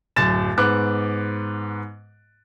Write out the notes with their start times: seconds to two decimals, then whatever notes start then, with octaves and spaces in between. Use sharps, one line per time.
0.16 D1 F#2 A6 E7
0.58 G#2 B3 D6 F#6